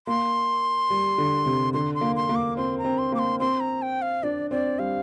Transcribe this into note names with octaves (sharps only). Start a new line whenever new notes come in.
A#3 C6
G3
D3
C3
D3 C6
C6
A#3
C6
A#3
D6
C4 C6
A#5
C4
C6
A#3 D6
C6
C4 C6
A#5
G5
F5
D4 D5
C4 D5
G3 F5